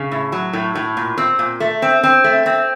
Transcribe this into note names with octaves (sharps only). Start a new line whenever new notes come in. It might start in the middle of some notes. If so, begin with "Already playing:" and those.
Already playing: C#3
A2
F#3
A2
A2
A#2
C4
A#2
A3
C4
C4
A3
C4